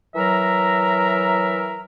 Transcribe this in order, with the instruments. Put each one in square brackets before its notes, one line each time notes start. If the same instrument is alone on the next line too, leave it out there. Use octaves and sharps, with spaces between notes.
[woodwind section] E3 F#3 A#4 E5 A#5